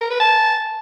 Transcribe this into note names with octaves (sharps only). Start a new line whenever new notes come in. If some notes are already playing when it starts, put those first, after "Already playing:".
A#4
B4
A5